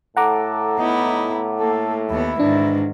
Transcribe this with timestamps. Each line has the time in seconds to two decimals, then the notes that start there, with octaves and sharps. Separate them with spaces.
0.17 A2 A4 F#5 A#5 D6
0.79 B3 D#4 E4
1.60 A#3 A4
2.10 D#2 B3 E4
2.40 G#2 D#3 E3 D4